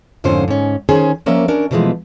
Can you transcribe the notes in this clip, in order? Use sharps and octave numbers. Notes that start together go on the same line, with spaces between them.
F2 G#2 D3 F3 C#4 C5
G#2 C#4
D#3 C#4 G#4 C5
F3 A#3 C#4 A#4 D5 E5
C#4 D4 A#4
B2 D3 E3 F3 G#3 A3